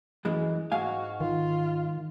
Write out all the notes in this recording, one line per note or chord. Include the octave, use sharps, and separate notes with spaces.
F#2 E3 G#3
G#2 F#4 F5 G#5
D#3 F4